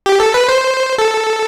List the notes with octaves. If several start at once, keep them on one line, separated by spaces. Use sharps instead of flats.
G4
A4
B4
C5
A4